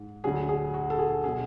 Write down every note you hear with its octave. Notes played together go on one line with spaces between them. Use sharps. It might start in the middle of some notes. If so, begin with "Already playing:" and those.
Already playing: G#2
D2 D3 F#3 G#4
G#4
F#4
A4
G#4
B2 F#3 G#4